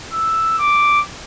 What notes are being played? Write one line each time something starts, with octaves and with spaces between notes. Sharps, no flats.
E6
D6